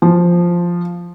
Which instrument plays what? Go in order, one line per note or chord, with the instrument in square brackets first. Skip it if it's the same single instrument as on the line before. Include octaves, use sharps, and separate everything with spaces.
[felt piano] F3